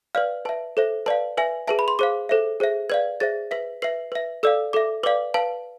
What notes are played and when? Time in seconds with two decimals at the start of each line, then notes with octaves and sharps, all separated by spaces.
0.15 B4 D5 F5 F6
0.45 B4 E5 A5
0.77 A4 C5 E5
1.06 B4 D5 F5 A5
1.37 B4 E5 G#5
1.68 G#4 B4 E5 A5
1.79 B5
1.88 C6
1.99 G#4 C5 F5 D6
2.29 A4 C5 E5
2.60 G#4 C5 E5
2.90 B4 D5 F5 G#6
3.20 G#4 C5 E5 A6
3.51 B4 E5 B6
3.82 B4 E5 C7
4.12 B4 E5
4.43 A4 D5 F5 E6
4.73 A4 E5 D6
5.03 B4 D5 F5 D6
5.34 B4 F5 A5